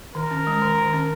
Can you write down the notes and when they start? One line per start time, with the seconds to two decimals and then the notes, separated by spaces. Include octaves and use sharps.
0.15 D#3 A#4
0.31 C#4
0.47 G#3
0.62 D#3
0.78 D#3
0.93 C#4